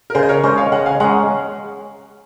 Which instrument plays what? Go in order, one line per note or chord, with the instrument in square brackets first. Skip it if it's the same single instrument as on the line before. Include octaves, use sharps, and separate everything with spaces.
[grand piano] A#4
[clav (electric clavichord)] C#3 [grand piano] G#4 C5
[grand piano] D#5
A#4 C#5
[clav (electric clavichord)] G#3 C#4 [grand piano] C5 D#5
[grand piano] C#5 F5
[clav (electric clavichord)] C#3 [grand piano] D#5 F#5
[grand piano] F5 G#5
[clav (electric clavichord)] G#3 C#4 [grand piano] F#5 A#5